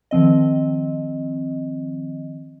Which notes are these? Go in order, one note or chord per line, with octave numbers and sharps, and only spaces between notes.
D#3 F3 C4 D#5